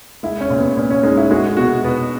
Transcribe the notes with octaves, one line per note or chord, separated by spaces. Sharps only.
G#3 E4
C#4
A#2
B3
A#2 B3
C#4
G#3 D#4
E4
G#3 F#4
B2 F#4
B2 B3